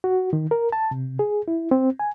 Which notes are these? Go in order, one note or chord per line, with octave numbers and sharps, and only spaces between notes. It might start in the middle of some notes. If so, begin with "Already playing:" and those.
F#4
D#3
A#4
A5
C3
G#4
E4
C4
G#5